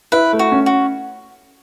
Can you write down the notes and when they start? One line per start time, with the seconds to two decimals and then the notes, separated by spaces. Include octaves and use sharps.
0.12 E4 B4
0.33 A3
0.39 F#4
0.52 C#4
0.66 F#4